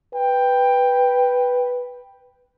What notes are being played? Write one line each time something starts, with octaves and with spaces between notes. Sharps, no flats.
B4 G5